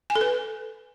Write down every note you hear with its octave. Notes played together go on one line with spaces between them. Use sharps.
G#5
A4
B4